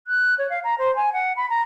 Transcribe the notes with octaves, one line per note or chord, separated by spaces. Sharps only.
F#6
C#5
F5
A#5
C5
G#5
F#5
B5
A#5